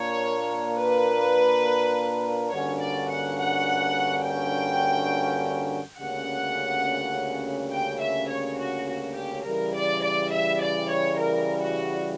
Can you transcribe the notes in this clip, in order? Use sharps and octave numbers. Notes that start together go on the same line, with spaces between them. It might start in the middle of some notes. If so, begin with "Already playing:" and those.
Already playing: A#2 A#3 D4 A#4 C#5
B4
G2 D3 A#3 C#4 F#4 C#5
D5
F#5
F#5
G5
D2 C#3 G3 A#3 C#4 F#5
G5
E5
C#5
F#4
F#4
G4
C#3 E3 G3 A#4
D5
D5
E5
D5
C#5
A#4
F#4